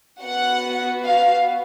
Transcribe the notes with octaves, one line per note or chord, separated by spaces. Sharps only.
B3 F#4 F#5
F5